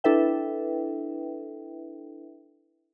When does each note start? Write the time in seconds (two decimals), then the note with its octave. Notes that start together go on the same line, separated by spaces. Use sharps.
0.04 D4 E4 A4 B4 E5 G5